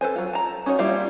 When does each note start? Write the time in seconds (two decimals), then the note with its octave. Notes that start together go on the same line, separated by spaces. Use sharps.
0.01 A4 B4 C5 G#5
0.16 F#3 F4
0.33 A5 A#5
0.66 C#4 D#4 F#4 C#5
0.79 G3 A#3 E4 F4 F5